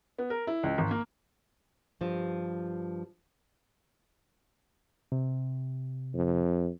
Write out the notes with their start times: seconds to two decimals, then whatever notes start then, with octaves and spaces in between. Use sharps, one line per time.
0.18 B3
0.30 A#4
0.47 E4
0.63 C#2
0.78 G#1
0.91 A#3
2.01 G2 F3
5.12 C3
6.15 F2